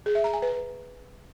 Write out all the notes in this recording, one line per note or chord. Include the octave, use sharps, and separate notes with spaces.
G#4
E5
A#5
G#5
B4